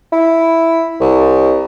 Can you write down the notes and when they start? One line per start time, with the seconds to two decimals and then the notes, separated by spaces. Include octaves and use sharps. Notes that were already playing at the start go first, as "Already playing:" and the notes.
0.12 E4
1.00 C2